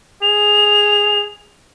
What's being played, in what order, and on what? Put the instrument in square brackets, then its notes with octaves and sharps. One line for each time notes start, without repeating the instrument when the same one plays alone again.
[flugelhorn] G#4 [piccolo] F7